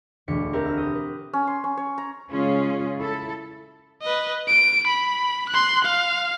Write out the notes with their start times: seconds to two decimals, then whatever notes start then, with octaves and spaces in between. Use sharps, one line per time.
0.28 E1 D2 A3 D4 B6 C#7
0.53 C4 G4 A#4 B4 E5
0.65 E5 F6
0.77 D#6 G6
0.95 B4
1.33 C#4
1.47 C6
1.64 C#4
1.77 C#5
1.98 A#5
2.31 C#3 G#3 C#4 F4 G#4
2.98 E4 A4
4.02 B4 D#5
4.48 D7
4.87 B5
5.50 C6 F#6
5.85 F5